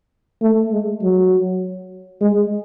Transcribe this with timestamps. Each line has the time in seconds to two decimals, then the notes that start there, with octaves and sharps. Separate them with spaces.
0.42 A3
0.72 G#3
1.02 F#3
2.21 G#3